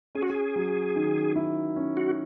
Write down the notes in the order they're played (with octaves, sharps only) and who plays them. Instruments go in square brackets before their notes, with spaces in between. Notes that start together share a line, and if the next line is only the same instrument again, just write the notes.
[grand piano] C#4 [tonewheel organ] G#4
[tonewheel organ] F#4
G#4
[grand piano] F#3
D#3
E4
C#4
[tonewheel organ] F#4